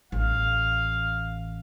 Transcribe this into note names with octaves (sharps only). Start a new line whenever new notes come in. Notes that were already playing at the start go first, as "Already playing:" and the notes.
A1 F5